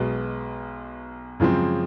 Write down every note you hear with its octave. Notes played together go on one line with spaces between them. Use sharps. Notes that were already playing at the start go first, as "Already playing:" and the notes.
Already playing: B1 B2 G#3
F#2 C#3 F3 G#3 C4